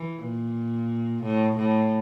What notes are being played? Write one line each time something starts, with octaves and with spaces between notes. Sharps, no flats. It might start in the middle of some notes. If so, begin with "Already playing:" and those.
Already playing: E3
A#2
A2
A2